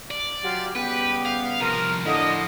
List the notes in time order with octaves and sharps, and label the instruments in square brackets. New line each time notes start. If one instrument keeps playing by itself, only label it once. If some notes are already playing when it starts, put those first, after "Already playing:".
[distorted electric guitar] D5
[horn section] F#3 G4 [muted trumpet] F4
[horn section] C#3 G3 B3 [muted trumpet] G4 [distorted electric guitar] B4
[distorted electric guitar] F5
[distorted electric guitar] C2 F3 [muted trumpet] A#4
[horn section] A2 D3 [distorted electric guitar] F3 [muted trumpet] D#5